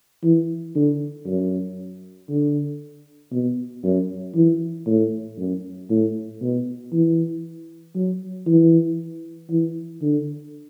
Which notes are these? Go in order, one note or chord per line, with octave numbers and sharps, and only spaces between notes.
E3
D3
F#2
D3
B2
F#2
E3
A2
F#2
A2
B2
E3
F#3
E3
E3
D3